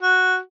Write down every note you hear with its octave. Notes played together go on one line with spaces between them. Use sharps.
F#4